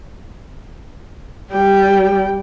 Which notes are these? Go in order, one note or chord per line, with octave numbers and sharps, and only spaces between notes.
G3 G5